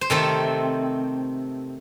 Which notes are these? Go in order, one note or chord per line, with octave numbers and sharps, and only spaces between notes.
C5
C3 D#3 A3 C4 A4